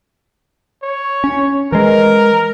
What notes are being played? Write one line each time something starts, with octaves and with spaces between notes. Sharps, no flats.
C#5
C#4
E3 G#3 A#4